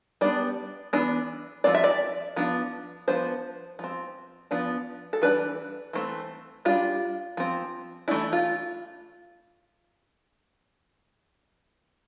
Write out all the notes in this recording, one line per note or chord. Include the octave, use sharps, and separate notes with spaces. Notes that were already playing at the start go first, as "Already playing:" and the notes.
G3 B3 D4 D5
E3 B3 D4
F3 C4 D5
E5
D5
F3 B3 D4
F3 B3 D4 C5
F3 C4
F3 B3 D4
A4
E3 G3 D4 B4
E3 A3 C4
G3 D4 F4
F3 C4
E3 A3 D4 E4
F4